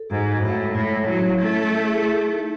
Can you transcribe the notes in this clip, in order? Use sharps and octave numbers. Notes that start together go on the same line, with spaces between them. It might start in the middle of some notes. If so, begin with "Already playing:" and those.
Already playing: A4
G#2 F#4
F#4
A2
G#3
A2 E4
C#5
F#3
C#4
A3 E4
E4
G#4
G#4
D#4